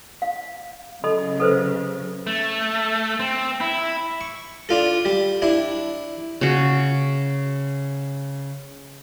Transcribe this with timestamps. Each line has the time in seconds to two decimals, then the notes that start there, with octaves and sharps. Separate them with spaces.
0.22 F5
1.04 C#3 F#3 A4 D#5 B5
1.40 A4 B4 C5
2.27 A3
3.20 C4
3.61 E4
4.21 C#6
4.69 D4 F4 A4
5.05 G3
5.42 D4 E4
6.41 C#3 F#4